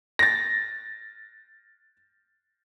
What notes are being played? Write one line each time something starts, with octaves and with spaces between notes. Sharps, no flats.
A6 A#6